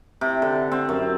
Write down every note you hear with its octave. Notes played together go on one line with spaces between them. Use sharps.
C3
D3
C4
F#2